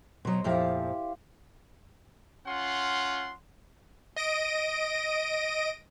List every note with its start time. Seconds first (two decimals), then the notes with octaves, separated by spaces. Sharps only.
0.25 B2 F#3 C5 D#5
0.44 F2 A#2 F3 E4 G4 F5
2.46 C#4 F4 F#5 C6
4.16 D#5 A#6 D7 D#7